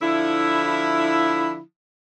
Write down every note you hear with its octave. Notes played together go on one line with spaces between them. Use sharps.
D3 F3 E4